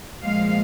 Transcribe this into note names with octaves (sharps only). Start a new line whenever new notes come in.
A#2 F3 G#3 F5